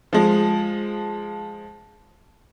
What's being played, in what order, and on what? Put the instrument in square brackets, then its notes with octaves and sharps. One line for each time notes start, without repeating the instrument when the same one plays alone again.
[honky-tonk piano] F3 G#3